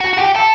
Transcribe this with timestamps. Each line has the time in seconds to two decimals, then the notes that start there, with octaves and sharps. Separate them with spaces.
0.01 F#4
0.13 F#4
0.18 G4
0.36 A4